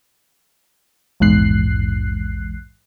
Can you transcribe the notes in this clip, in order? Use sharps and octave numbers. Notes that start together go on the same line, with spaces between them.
A#1 E2 G#2 F#6 C7